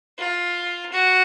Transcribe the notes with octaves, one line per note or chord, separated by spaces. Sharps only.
F4
F#4